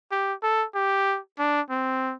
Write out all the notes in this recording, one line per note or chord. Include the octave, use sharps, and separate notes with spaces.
G4
A4
G4
D4
C4